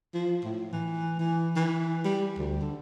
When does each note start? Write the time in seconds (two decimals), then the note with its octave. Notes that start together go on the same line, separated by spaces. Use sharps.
0.14 F3
0.45 A2
0.73 E3
1.19 E3
1.56 E3
2.05 G3
2.38 D2
2.61 D3